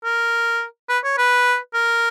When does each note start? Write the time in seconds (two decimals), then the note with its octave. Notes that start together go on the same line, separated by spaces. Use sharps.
0.04 A#4
0.89 B4
1.04 C#5
1.18 B4
1.74 A#4